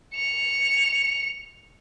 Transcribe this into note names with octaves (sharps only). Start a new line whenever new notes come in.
C#7 F7